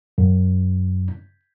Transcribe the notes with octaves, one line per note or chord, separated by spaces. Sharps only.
F#2